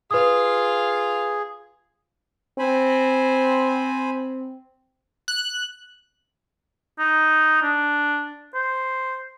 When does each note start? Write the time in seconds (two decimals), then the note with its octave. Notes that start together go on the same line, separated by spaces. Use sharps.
0.11 F4 G#4 B4 F5 D#6
2.59 C4 C5 G#5 B5
5.28 F#6
6.99 D#4
7.62 D4
8.54 C5